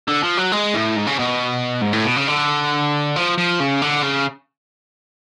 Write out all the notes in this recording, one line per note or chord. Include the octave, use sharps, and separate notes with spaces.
D3
F3
F#3
G#3
A2
G#2
C#3
B2
G#2
A2
B2
C#3
D3
F3
F3
C#3
D3
C#3